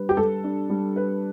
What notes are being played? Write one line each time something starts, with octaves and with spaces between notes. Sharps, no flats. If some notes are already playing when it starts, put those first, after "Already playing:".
Already playing: G3 D4 B4
G4
G3 A4
D4
G3
B4